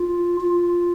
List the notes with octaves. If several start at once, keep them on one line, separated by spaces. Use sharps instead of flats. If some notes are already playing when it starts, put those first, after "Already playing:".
Already playing: F4
F4